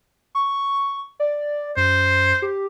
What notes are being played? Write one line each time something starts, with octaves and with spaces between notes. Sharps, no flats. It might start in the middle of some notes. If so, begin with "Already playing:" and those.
C#6
D5
F#2 C5
G4